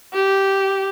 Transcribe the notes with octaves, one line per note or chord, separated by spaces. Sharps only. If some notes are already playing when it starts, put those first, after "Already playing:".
G4